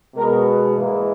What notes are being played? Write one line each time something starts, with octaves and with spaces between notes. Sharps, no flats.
B2 G#3 A#4
G#2 E3 G#3 A#3